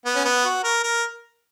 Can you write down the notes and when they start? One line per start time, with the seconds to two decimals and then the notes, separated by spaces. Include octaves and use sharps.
0.05 B3
0.15 C#4
0.25 B3
0.45 F#4
0.64 A#4
0.84 A#4